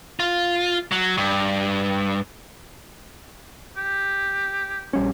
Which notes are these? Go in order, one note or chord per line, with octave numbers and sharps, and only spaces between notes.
F4
F#3
G2
G4
A#1 G3 C#4